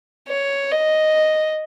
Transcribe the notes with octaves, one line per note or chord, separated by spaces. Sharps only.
C#5
D#5